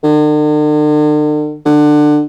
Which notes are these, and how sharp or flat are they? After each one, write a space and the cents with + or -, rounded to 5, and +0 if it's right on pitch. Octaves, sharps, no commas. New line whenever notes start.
D3 +45
D3 +20